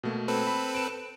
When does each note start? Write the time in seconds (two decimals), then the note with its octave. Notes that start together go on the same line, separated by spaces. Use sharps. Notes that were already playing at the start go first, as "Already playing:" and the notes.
0.03 B2 A3 A#3
0.28 C4 A4 B4
0.47 B5
0.74 D7 E7